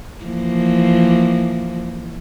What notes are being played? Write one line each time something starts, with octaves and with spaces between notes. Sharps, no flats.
E3 F3 A#3